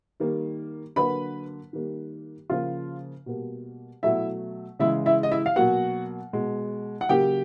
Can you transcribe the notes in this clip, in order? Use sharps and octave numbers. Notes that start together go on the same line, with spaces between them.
D#3 G3 A#3
D3 F#3 A#3 B4 B5
D#3 G3 A#3
C#3 F3 A#3 F4 F5
B2 G3 A#3
B2 F#3 A3 E4 E5
C#3 E3 G#3 E4 E5
E4 E5
D#5
E4 E5
F5
B2 F#3 A#3 F#4 F#5
B2 G#3
F#5
C#3 F#3 A#3 G4 G5